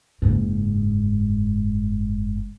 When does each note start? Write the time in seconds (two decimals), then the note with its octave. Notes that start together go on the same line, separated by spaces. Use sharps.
0.22 F#1 G#2